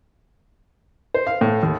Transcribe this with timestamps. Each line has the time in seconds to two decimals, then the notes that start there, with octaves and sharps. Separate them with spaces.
1.14 C5
1.27 F5
1.41 A2
1.63 D#2